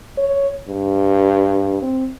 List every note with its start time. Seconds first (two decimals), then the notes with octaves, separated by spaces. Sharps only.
0.17 C#5
0.69 G2
1.82 C4